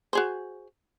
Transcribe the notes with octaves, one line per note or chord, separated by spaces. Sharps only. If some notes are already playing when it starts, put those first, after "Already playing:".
F#4 G#4 C5